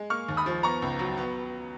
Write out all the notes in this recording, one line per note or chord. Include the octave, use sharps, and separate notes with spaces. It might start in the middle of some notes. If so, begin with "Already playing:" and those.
Already playing: G#3
A#3 C#6 F6
D#2
B5 D#6
F3
B3 A#5 C#6
C#2
F#3
B3